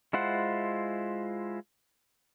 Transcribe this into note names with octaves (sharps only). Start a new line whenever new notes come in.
G#3 E4 F4 C5 F#5